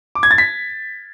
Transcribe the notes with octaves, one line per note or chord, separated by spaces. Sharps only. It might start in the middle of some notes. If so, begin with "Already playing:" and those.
D6
G#6
A6
B6